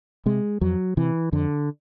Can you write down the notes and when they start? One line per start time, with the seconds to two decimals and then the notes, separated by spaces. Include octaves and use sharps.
0.26 C3 G#3
0.61 F2 F#3
0.97 C3 E3
1.32 F2 D3